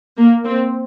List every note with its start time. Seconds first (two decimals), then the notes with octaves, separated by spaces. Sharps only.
0.17 A#3
0.45 C4